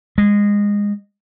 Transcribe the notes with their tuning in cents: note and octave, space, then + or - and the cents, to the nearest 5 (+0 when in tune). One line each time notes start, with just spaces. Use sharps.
G#3 -20